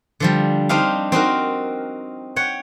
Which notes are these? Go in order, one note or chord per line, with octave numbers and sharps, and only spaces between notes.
D3 F3 G3
C4 D4 D#4 G4 F5
C4 D#4 F#4 A#4
C#5 F#5 G5